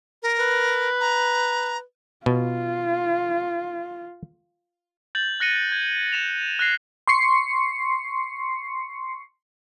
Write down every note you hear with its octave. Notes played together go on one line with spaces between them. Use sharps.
A#4
B4
A#5
B2 F4
G6 A6 F#7
F#6 A#6 C#7 D#7
G#6
A#6 E7 F7
F#6 A#6 C7
C6 C#6 C7 C#7